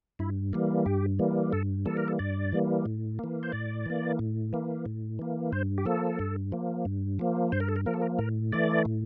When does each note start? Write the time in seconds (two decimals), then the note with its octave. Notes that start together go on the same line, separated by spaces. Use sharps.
0.19 G2 E4
0.53 E3 G3 A#3
0.86 G2 G4
1.19 E3 G3 A#3
1.53 G2 A4
1.86 E3 G3 A#3 A4
1.97 A#4
2.08 A4
2.19 G2 D5
2.52 E3 G3 A#3
2.86 A2
3.19 E3 A#3
3.43 C5
3.52 A2 D5
3.86 E3 A#3
4.19 A2
4.53 E3 A#3
4.86 A2
5.19 E3 A#3
5.52 G2 C5
5.78 G4
5.86 F3 A#3 A4
6.19 G2
6.52 F3 A#3
6.85 G2
7.19 F3 A#3
7.52 G2 C5
7.60 A#4
7.69 A4
7.76 A#4
7.86 F3 A#3 A#4
7.94 A4
8.02 A#4
8.19 A2 A#4
8.52 E3 A3 D5
8.85 A2